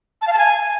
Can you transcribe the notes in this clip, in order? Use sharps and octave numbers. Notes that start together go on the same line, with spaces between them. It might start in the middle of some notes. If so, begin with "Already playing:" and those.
A5
F5
A5
G#5